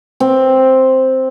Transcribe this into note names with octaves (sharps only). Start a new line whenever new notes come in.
C4